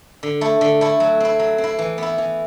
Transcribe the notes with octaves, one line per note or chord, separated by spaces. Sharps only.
D3
A3 E4
D3
A3 E4
F#3
C4 E4
F#3
C4
E4
E3
B3 E4
E3